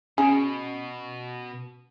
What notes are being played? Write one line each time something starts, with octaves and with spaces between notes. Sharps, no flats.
B2 C#4 G#4